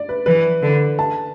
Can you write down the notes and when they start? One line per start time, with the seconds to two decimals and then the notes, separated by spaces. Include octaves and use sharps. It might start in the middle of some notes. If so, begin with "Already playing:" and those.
Already playing: D5
0.09 B4
0.26 E3 B4
0.62 D3
0.99 A5